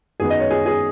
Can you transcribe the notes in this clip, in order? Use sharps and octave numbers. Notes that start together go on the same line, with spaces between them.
F#2 D#3 F#3 B3 G#4
D#5
C#5
G#4
G#4